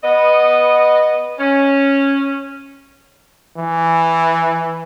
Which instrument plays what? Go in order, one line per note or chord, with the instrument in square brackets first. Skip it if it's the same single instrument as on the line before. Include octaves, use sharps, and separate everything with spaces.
[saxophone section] B3 D#5
C#4
[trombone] E3